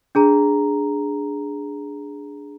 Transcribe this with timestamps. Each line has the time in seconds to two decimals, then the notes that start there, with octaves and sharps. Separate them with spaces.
0.15 D4 G#4 A#5